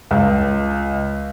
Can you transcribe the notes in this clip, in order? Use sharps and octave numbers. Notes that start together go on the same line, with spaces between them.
C#2